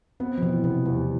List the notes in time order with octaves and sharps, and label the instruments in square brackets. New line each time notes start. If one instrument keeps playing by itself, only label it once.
[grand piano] B3 [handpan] C4
[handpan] F3
[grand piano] B2 [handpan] E3
[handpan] C3 [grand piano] B3
[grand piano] E2 [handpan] G3